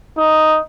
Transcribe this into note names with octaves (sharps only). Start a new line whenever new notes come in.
D#4